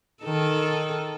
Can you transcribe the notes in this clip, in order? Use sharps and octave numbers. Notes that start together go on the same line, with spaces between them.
D#3 A4